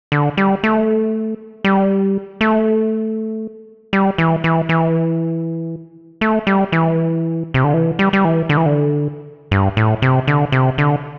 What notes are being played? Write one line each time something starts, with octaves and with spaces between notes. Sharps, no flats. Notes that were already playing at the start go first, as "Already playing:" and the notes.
D3
G3
A3
G3
A3
G3
E3
E3
E3
A3
G3
E3
C3
D3
E3
G3
G3
E3
D3
E3
D3
G2
A2
C3
D3
C3
D3